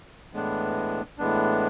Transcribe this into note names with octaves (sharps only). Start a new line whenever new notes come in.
A2 E3 G#3 B3 D4
A2 E3 G#3 B3 D4